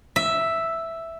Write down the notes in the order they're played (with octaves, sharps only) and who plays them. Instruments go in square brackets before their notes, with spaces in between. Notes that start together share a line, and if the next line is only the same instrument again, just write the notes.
[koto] E5